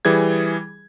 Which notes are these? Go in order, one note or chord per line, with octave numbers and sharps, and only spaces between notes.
E3 G3 G#4 G#6